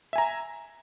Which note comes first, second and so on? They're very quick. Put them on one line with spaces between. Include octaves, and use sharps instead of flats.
E5 G#5 A#5